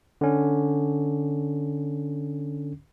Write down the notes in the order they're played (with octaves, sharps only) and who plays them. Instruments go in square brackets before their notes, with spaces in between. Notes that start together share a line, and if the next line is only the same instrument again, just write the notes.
[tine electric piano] D3 C#4